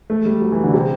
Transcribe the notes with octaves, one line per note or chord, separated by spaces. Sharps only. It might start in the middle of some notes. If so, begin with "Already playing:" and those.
A3
G3
F#3
E3
D3
C3